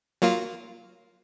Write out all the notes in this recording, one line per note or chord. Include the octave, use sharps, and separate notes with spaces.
F#3 A#3 F4